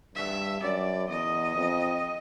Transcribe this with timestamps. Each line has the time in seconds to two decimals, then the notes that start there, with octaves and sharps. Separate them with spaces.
0.16 G2 E5
0.62 F#2 D5
1.09 E2 D#5
1.55 F2